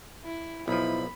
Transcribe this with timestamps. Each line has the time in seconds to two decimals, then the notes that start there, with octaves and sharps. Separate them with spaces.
0.24 E4
0.68 B1 F3 E4 B5